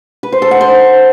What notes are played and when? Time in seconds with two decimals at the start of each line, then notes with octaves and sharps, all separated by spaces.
0.23 B4
0.32 C5
0.42 A4
0.51 F#5
0.61 C5